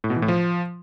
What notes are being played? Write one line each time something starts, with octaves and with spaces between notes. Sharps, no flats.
A2
B2
E3
A2
F3